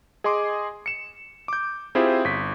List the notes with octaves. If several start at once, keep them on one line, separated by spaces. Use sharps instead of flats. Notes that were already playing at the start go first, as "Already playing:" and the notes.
G#4 D#5 G#5 C6 D6
C#7 E7
D6 G6
C4 E4 F4 G4 G#4 C5
G1 B6